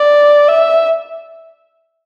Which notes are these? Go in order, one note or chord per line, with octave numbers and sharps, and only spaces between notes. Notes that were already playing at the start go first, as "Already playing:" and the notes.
Already playing: D5
E5